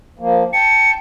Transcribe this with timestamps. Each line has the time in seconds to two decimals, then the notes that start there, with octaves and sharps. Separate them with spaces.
0.19 F3 A#3
0.53 G5 A5 C#7